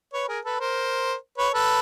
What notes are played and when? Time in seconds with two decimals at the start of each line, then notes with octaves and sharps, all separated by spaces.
0.13 B4 C#5
0.28 G#4 A#4
0.45 A4 B4
0.60 A#4 C5
1.38 B4 C#5
1.54 A4 B4